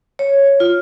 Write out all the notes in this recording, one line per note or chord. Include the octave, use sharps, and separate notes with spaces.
C#5
F4